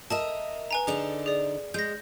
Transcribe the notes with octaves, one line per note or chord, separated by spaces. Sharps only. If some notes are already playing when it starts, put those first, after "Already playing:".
A#4 D#5 E5 A5 E7
B4 G#5 A#5
D3 D4 D#4 G#4 F7
G#4 D5
G#3 G6 A#6